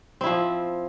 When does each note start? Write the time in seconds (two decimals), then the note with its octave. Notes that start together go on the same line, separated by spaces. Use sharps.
0.21 C4
0.24 E4
0.26 F3